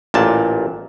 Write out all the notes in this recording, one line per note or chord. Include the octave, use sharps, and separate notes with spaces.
A1 A#2 A5